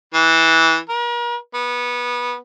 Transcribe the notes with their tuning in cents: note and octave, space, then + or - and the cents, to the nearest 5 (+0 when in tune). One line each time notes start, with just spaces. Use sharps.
E3 -15
A#4 +40
B3 -20